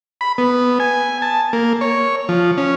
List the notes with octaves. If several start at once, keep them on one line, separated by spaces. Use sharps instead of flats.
B5
B3
G#5
A5
A#3
C#5
F3
C#4